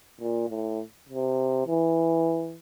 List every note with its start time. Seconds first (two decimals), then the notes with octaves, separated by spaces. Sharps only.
0.21 A#2
0.50 A2
1.09 C3
1.67 E3